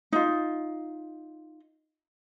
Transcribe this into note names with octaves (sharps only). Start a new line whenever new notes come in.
D#4 F4